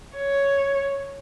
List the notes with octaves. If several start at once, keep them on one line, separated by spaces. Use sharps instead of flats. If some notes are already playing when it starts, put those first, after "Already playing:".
C#5